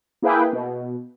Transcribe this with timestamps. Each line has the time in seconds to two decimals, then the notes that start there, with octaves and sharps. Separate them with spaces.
0.22 A#3 E4 G#4 B4 G5
0.53 B2